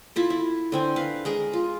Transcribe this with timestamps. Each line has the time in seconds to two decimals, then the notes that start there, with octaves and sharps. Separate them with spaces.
0.16 E4 F4 A4
0.30 E4
0.72 D3 C4 G#5
0.96 B4 F5
1.25 G#3 G#4 A#4
1.53 F4